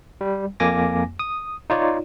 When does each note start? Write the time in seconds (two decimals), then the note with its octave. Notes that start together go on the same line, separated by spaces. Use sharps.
0.21 G3
0.60 F2 A#3 G#5 D6 A#6
1.19 D#6
1.70 D#4 F4 C#5 D5